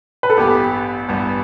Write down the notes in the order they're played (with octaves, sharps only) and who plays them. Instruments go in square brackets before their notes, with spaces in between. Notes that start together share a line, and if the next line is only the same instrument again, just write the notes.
[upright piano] B4
A4
[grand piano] A1 G2 G3 B3 [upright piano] G4
[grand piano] A1 G2 G3 B3